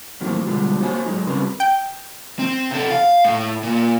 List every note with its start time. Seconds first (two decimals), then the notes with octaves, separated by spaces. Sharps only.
0.21 A2 D#3 E3 F#3 A#3 C4
0.46 B2 D3 F3 G3 G#3
0.80 F2 A#3 F#4 C5 C#5 G#5
1.06 G#2 F#3 G#3 D#4
1.26 C#3 G3 C4 C#4 A#4 B4
1.60 G5
2.39 C4
2.71 C3 A4
2.91 F5
3.24 A2
3.63 A#2